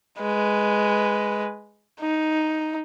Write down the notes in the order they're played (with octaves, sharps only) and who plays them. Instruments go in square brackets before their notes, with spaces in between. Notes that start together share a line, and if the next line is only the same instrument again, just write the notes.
[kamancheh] G#3 B4
D#4